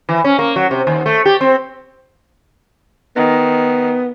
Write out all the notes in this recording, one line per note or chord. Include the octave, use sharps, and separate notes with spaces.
E3
C#4
A#3
F#3
C3
D#2
A3
G4
C4
D#3 B3